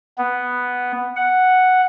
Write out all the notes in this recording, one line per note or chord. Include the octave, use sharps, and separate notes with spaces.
B3
F#5